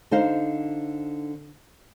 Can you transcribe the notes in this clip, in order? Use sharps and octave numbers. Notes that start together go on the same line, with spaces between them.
D3 D#4 C5 F5